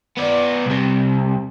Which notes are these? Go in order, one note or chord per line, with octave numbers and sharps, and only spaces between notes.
B3 D5
C2 C3